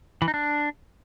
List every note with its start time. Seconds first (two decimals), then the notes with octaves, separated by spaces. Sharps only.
0.22 E3
0.28 D#4
0.34 D4